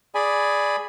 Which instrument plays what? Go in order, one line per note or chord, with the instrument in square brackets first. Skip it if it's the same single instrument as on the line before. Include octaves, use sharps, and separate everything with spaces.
[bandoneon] G#4 D5 G#5 B5